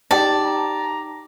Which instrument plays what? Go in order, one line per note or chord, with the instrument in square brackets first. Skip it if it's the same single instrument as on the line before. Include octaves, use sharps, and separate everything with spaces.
[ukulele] D#4 G4 [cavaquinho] D5 [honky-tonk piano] A5
[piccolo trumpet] A#5